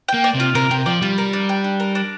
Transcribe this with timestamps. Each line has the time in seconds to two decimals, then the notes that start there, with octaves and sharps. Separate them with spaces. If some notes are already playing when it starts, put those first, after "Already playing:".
0.08 G5
0.14 A#3
0.24 D5
0.35 C3
0.40 F4
0.55 C3 A#4
0.70 C3 G5
0.86 F3 D5
1.02 G3 F4
1.18 A#4
1.33 D4
1.49 G5
1.64 D4
1.80 A#4
1.95 D4